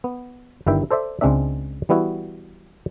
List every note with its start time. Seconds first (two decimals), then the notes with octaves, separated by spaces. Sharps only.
0.04 B3
0.66 G1 G2 D#3 E4 E5 G5
0.91 A4 C5 D5 E5
1.21 C#2 G#3 C4 D4 E5
1.89 E3 G3 B3 E4 F#4